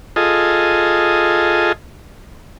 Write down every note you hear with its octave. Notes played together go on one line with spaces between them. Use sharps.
F4 G#4 A4 D#5